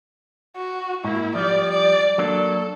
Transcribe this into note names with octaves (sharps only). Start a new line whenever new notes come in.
F#4
G#2 A#3 E4
F3 G3 D5
D5
F#3 A#3 D4 A4